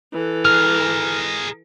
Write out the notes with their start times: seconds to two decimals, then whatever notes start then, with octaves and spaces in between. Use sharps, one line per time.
0.13 E3 A4
0.45 G#4 A#4 F6